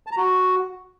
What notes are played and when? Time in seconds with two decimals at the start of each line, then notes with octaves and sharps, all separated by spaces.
0.07 A5
0.12 A#5
0.17 F#4